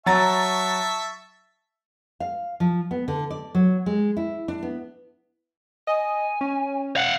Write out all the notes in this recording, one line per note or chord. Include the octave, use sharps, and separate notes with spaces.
F#3 E5 A5 A#5 C#6 A6
F5
F3
B3
D3
D5
F#3
G#3
E4
D4
B3
D#5 G#5
C#4
F5 F#5